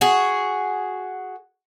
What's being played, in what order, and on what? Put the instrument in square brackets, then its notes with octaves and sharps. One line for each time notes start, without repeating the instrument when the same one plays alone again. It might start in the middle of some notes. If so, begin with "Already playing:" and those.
[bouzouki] F#4 G#4